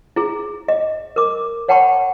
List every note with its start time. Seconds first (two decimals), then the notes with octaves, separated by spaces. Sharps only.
0.16 E4 G#4
0.68 D#5
1.16 A#4 D6
1.69 C#5 F#5 G5 A5 B5 C#6